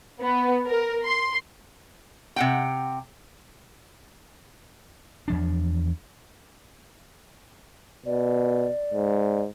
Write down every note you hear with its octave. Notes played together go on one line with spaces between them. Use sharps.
B3
A#4
C6
C3 F#5 G5
E2 F3 D4
B2 D5
G#2